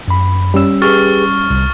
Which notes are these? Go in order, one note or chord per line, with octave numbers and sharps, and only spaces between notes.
F#2 B5
G3 C#4 E6
G4 G#4 B4 C#6 F6 A6
C2